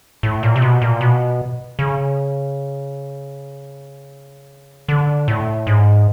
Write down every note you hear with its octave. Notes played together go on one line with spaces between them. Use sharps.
A2
A#2
C3
B2
A#2
B2
C#3
D3
A2
G#2